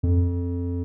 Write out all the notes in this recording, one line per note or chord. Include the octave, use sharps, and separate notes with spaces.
F2